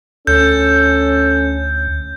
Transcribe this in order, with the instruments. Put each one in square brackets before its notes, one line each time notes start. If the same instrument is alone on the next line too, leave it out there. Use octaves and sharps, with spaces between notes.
[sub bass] D2 [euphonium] C#4 [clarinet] A4 [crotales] G6